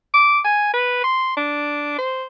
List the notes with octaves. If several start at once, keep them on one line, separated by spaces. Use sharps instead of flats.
D6
G#5
B4
C6
D4
C5